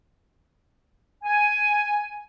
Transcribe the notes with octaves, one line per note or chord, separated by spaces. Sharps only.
G#5